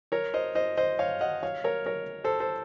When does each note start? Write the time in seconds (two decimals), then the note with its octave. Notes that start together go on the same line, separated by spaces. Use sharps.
0.12 A#4 C#5
0.34 C5 D#5
0.55 C5 D#5
0.77 C5 D#5
0.99 C#5 F5
1.21 D#5 F#5
1.43 C#5 F5
1.64 A#4 C#5
1.86 A#4 C#5
2.24 A4 C5
2.40 A4 C5